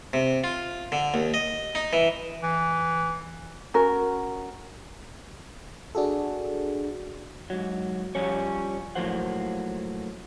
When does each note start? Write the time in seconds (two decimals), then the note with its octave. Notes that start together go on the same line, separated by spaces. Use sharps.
0.13 C3
0.44 F4
0.92 D3
1.14 D#2
1.34 D#5
1.75 D#4
1.93 E3
2.43 E3
3.74 C#4 F#4 A#4
5.95 D4 F#4 G#4 A4
7.50 G#2 F#3
8.15 F3 G3 C#4 C#5
8.95 A2 F3 F#3 A#3 C5 F#5